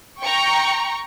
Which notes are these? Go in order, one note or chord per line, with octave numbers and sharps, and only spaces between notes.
G5 A#5 C#6